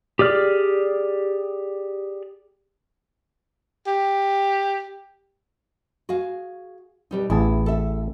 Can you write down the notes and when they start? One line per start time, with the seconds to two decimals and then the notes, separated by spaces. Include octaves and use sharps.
0.19 G4 G#4 D5 F6
3.87 G4
6.09 F#4 G#4 F5
7.11 B2 G3 D#4
7.30 A1 B3 E4 G#4 A5
7.66 A4 E5